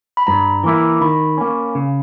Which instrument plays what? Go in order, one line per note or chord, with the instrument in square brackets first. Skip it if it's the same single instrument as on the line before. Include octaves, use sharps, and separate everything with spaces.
[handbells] B5
[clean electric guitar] G2 [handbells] A#5
[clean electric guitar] E3 A#3 E4
[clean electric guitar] D#3 [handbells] B5
[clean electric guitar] A#3 C#4
C#3